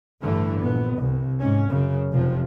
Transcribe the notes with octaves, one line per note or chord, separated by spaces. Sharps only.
A1 G2 D3 E3 A3
A#1 B3
C2
G#2 C#4
F#2 C#3
F1 C3 F3